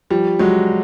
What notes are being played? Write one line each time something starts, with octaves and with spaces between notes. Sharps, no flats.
F3 G3
F#3 G#3